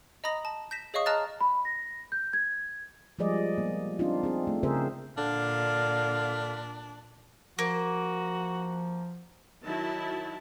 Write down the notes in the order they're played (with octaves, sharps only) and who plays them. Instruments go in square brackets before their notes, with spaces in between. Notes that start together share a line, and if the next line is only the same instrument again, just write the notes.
[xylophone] D#5 A#5 B5 D#6 A#6
A5
G6 A#6 B6 E7
G#4 C#5 D#5 F5 C#6 D#6
D#5 A5 A#5 F6 F#6 A6
[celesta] B5
A#6
G6
G#6
[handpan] F3 G3 G#3 G#4 D5 D#5
A#3 B3
C4 D4 D#4 F4
C4 G#4
A3
C#3 C4 G#4 A#4 C5 E5
[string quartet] A#2 [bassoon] D3 [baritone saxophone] D4 [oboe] F5
[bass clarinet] F3 [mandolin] A#3 [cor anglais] F#4
[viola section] D#3 F#3 E4 A5